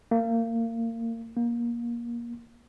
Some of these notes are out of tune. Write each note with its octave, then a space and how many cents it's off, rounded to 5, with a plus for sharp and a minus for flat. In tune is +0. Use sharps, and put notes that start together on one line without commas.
A#3 -25
A#3 +25